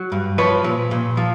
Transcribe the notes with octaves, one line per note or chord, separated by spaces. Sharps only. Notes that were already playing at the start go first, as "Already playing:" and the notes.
Already playing: F#3
G2
F3 B4 C#5
A#2
A#2
F3